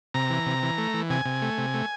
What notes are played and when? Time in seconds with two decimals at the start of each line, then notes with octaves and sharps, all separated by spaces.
0.14 C3 A#5
0.30 E3
0.46 C3
0.63 E3
0.78 A3
0.94 E3
1.10 C3 G#5
1.25 C3
1.42 A3
1.58 C3
1.74 A3